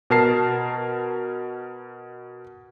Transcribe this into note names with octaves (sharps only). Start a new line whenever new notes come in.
B2 A#4 A5 C7